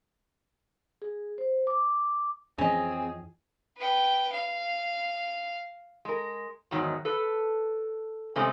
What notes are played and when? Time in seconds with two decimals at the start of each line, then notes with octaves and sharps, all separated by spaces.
1.02 G#4
1.38 C5
1.67 D6
2.58 F2 E3 F3 C4 C#4 G#4 D#5
3.77 B4 G5
4.32 F5
6.05 G#3 A#4
6.71 E2 G#2 D#3 F#3
7.05 A4 B4
8.35 C3 G#3 A3 C4 C#4